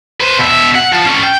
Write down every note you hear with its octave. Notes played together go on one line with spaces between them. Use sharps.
B4 C5
B2 E5
F#5
F3
C#4 A4
G5